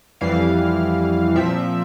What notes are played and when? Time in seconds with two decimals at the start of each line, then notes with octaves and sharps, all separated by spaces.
0.21 F2 E3 G3 F5
1.35 A#2 F3 C4 E5